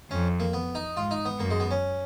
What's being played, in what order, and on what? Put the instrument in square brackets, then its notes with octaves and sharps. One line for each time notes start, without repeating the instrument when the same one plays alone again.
[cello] F2 [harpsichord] C#4
[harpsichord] A#3
B3
D#4
[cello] G#2 [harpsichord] F4
[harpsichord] D#4
B3
[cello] F#2 [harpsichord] A#3
[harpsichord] G#3
B3
C#4